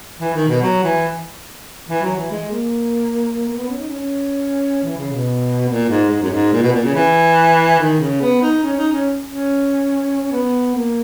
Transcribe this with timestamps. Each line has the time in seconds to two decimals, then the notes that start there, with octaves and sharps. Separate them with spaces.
0.19 E3
0.34 D#3
0.48 B2
0.62 F#3
0.83 E3
1.89 E3
2.02 F#3
2.16 E3
2.31 G#3
2.51 A#3
3.48 A#3
3.57 B3
3.68 C#4
3.78 D#4
3.89 C#4
3.99 C#4
4.84 E3
4.97 C#3
5.12 B2
5.68 A#2
5.89 G#2
6.10 G#2
6.22 F#2
6.31 G#2
6.53 A#2
6.62 B2
6.73 A#2
6.84 C#3
6.95 E3
7.79 D#3
8.00 C#3
8.21 B3
8.42 D#4
8.63 C#4
8.77 D#4
8.92 C#4
9.26 C#4
10.31 B3
10.75 A#3